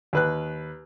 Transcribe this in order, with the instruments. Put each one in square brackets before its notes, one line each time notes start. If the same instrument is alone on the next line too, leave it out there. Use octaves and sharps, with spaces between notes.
[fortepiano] D#2 B4 F#6